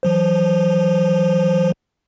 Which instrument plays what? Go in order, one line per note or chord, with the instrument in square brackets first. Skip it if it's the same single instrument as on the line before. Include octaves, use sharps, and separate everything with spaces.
[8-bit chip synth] E3 F#3 C5